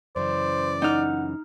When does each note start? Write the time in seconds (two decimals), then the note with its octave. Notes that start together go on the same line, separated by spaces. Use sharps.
0.16 F#2 C#3 E3 C5 D5
0.82 D#4 F#5 F6